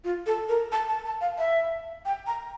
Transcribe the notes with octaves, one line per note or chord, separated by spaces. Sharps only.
F4
A4
A#4
A5
A5
A5
F5
E5
G5
A#5